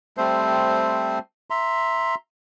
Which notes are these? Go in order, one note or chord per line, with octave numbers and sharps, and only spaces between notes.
G3 A3 C4 C5
E5 A#5 C6